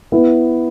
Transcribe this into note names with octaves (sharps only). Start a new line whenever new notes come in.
B3 E4